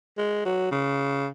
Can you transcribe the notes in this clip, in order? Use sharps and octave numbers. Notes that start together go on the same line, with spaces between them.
G#3
F#3
C#3